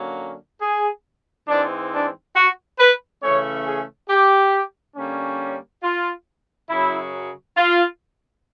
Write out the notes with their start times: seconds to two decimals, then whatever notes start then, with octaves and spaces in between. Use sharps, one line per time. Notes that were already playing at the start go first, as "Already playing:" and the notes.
Already playing: D3 F#3 A#3 C#4
0.61 G#4
1.48 G#2 E3 G#3 C4 D4
1.91 D4
2.35 F#4
2.79 B4
3.22 C#3 E3 A3 C#4 C#5
3.65 G#4
4.09 G4
4.95 D3 G3 A#3 C#4
5.83 F4
6.69 F#2 C#3 F#3 E4
7.56 F4